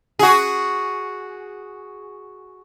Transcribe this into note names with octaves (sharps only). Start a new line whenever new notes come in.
F#4 G#4